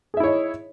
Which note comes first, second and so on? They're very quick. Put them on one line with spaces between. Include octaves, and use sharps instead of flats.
G#4 E5 E4 C#5 D#5